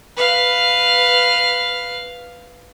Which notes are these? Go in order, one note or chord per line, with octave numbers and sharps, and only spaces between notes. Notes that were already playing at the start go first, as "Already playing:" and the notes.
B4 F5